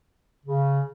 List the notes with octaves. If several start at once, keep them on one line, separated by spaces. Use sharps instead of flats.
C#3